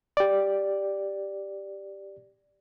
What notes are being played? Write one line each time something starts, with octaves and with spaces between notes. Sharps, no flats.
G4 D5